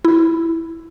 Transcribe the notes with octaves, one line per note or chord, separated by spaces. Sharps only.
E4